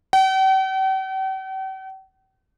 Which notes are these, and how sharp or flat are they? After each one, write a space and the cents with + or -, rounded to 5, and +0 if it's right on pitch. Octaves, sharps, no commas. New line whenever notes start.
G5 -45